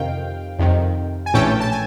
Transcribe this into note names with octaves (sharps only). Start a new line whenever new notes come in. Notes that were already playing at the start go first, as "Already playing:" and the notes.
Already playing: F2 C3 D#3 F5 G5
F2 C3 D#3
G#5
A#1 A2 E3 A3 C#4 G5 A5
A5
G#5